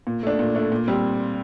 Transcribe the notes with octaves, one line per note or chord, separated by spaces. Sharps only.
A#2
A3 D4
A#2
A3 D4
A#2
G3 C4